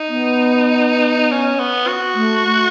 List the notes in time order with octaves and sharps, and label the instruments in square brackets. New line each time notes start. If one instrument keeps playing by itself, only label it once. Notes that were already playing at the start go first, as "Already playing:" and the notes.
Already playing: [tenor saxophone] D#4
[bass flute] B3
[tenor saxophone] C#4
B3
F#4
[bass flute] A3